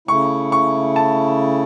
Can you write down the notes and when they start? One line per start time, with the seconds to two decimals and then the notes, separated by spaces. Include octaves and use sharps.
0.08 C#3 A3 E4 C#6
0.52 C#6
0.96 A5